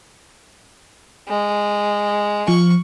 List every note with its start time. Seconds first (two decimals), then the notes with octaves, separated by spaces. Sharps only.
1.28 G#3
2.48 F3 C#6